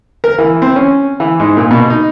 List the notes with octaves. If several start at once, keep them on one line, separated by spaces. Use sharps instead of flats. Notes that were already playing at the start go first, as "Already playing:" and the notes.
A#4
E3
C4
C#4
E3
G#2
A#2
B2
D#4